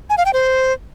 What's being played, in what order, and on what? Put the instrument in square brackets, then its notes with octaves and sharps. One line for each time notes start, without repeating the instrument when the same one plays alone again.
[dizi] G#5
F5
G5
C5